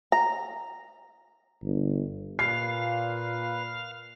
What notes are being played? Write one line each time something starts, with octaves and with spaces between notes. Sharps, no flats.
A#5
G1
A#2 B4 F5 C7